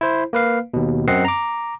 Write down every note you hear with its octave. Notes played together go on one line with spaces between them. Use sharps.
E4 C5
A#3 B4 F5
D#2 B2
F#2 C4 D#5 F#5 C7
A#5 D6